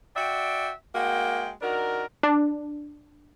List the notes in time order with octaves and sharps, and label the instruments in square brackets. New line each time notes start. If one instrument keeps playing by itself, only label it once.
[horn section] F#4 D5 E5 G5
G#3 A#3 F#4 G5
D#3 D4 F#4 A#4
[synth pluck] D4